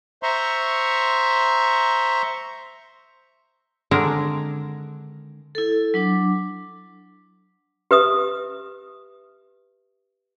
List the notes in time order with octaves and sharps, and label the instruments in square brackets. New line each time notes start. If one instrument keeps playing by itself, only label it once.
[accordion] C5 E5 A#5 C6 C#6
[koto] D3 D#3 G#3 C4 D4 A#4
[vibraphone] E4 A4
F#3 D4 D6
[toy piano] G4 B4 E5 D#6